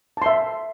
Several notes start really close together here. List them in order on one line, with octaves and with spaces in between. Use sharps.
A5 C6 E5